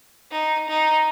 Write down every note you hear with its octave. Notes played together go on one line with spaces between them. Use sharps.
D#4
D#4